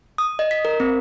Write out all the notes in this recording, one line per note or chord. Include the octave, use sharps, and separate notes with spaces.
D#6
D#5
B6
A#4
C4